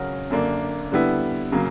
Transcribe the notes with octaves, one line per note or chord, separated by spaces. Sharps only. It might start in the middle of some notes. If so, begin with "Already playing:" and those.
Already playing: C#3 F#3 C#4 F#4 A#4
F#2 D3 A#3 D4
D3 G3 B3 E4
C#3 F#3 A#3